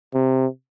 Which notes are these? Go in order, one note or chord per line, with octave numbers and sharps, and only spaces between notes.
C3